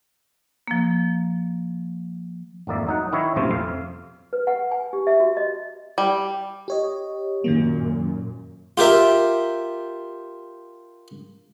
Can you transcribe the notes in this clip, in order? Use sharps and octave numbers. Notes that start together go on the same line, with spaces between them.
F3 A#3
G#1 F2 A#3 D5 E5
F#3 D#4 F#5
D#3 E4 C#5
A#1 F#2 A2 C3 F4 C5
F2 E5 F5
B4
F#5
G#5
G4
E5
F#4
D#5
G3
G4 C#5 D#5
F#2 A#2 D#3 F#3 A#3
F4 G4 A#4 E5